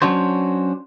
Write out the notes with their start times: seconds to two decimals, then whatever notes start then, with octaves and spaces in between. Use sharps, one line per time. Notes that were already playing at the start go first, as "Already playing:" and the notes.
0.02 F#3 C#4 D4 F#4 C5